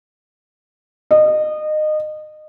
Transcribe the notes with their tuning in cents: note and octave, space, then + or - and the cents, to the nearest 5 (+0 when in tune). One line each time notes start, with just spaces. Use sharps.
D#5 -25